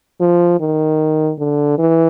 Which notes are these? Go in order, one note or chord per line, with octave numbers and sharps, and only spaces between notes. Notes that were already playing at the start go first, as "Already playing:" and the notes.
F3
D#3
D3
E3